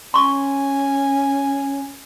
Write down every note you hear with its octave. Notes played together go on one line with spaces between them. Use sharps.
C#4 G#5 C6 C#6